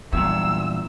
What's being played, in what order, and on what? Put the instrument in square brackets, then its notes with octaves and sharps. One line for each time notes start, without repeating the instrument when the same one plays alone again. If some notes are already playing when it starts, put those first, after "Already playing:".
[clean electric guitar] E2 G2 A#2 [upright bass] F#3 [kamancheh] E6